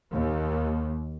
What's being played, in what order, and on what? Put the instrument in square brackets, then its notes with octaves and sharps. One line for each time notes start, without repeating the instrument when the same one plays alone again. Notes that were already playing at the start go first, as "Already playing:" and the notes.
[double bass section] D#2